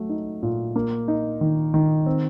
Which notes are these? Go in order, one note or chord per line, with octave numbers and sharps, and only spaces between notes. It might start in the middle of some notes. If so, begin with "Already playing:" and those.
Already playing: F#3 A3
D#4
A#2
A#3
D#4
D#3
D#3
C4